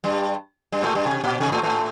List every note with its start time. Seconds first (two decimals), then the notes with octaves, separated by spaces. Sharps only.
0.04 G2 G3
0.72 G2 G3
0.83 A2 A3
0.95 G2 G3
1.06 C3
1.24 A#2
1.40 C3
1.52 A2 A3
1.63 A2 A3